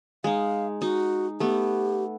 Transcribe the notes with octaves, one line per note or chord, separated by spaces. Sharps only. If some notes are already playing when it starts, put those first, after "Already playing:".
G#3 D#4 F5
D#4 F#4
A3 B3 G4